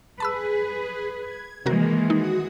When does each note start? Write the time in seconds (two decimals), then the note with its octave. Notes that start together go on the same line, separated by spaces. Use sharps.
0.20 G#4 B4 A5 B5 E6
1.20 G#6
1.66 C3 D#3 E3 G#3 A#3 F#4 A#4
2.10 D#4 F#4 D#6